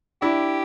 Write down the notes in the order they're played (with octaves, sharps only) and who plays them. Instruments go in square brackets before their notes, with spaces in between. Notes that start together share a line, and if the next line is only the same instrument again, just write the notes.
[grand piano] D4 E4 [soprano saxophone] G4